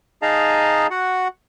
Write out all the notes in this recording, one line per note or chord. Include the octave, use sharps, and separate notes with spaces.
D#4 G#4 D#5 F5 A5 A#5
F#4 F#5